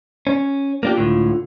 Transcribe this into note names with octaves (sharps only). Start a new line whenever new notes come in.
C#4
A#3 D4 F4 G4
C#2 A2 D3